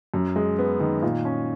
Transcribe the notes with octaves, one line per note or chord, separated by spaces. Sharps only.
F#2
G#3
B3
D#3
A#2
C#4